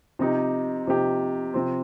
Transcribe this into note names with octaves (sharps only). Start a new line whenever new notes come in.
C3 F3 D#4 G4
C3 F3 D#4 G4
C3 F3 C4